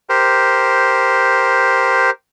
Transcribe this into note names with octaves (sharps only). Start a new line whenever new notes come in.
G4 A#4 C5